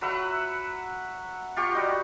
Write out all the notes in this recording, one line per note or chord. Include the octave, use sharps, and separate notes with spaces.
F#3 B4 E5 F#5
F4 G4 C#6
G3 D#4 F#4